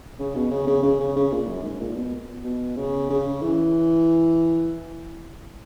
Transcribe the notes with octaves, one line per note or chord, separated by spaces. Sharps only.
C#3
B2
C#3
C#3
C#3
C#3
C#3
A#2
F#2
G#2
A#2
B2
B2
C#3
C#3
E3